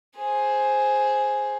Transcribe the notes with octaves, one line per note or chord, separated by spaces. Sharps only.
G#4 C5